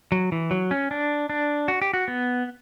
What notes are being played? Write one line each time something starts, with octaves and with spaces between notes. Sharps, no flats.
F#3
E3
F#3
C#4
D4
D4
F#4
G4
F#4
B3